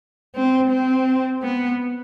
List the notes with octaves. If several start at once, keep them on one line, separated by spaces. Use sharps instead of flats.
C4
C4
B3